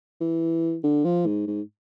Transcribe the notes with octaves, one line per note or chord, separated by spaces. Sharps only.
E3
D3
F3
G#2
G#2